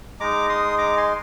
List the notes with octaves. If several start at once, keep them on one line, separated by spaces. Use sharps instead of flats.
G#3 D#4 A#5 D6
C6 D#6
A#5 D6
G#5 C6